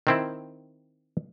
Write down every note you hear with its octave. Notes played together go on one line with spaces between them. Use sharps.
D#3 C4 E4